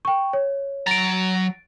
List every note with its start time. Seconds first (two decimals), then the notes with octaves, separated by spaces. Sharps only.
0.05 G5 C#6
0.33 C#5
0.87 F#3 A#5 A6 D7